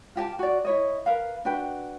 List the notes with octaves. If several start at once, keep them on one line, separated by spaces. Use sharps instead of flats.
F4 G4 G5 A5
F#4 D5
E4 C#5 D#5
A#4 B4 F5
D4 F#4 B4 G5